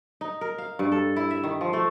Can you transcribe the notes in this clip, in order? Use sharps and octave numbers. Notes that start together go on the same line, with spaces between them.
D#4
A#4
F5
G2
A4
E4
E5
D#3
F3
A3